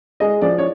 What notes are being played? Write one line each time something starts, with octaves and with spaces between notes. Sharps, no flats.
G#3 D#5
F3 D5
C#5